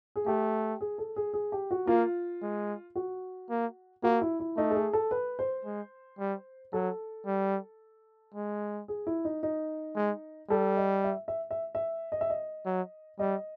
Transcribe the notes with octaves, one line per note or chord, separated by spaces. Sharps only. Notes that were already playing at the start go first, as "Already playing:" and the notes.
G#4
A3 G4
G#4
A4
G#4
G#4
G4
F#4
A#3 F4
G#3
F#4
A#3
A#3 F#4
E4
E4
A3 D#4
A4
G#4
A4
B4
C5
G#3
G3
F#3 A4
G3
G#3
G#4
E4
D#4
D#4
G#3
G3 A4
D#5
E5
E5
E5
E5
D#5
E5
D#5
F#3
G3 D#5